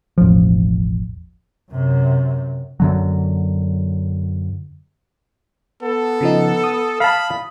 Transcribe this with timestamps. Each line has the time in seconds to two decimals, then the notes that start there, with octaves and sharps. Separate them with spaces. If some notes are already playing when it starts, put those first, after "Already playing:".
0.18 E1 A1 F3
1.71 F#2 C3
2.80 F#2 D3 F#3
5.82 B3 A4
6.21 C#3 F3 D#4
6.64 D#6
7.00 F5 A5 B5